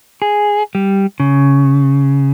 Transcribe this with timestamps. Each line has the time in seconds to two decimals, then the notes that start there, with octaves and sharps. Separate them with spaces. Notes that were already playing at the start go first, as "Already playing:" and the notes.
0.22 G#4
0.75 G3
1.20 C#3